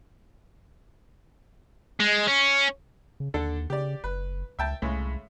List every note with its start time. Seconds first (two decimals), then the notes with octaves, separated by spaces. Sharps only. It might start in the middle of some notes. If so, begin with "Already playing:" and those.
2.00 G#3
2.27 C#4
3.20 C#3
3.34 D#2 D3 D4 A4
3.70 C#3 G4 D5
4.04 F#1 B4
4.59 C#2 E5 G5 A5
4.82 C2 A2 C#3 G#3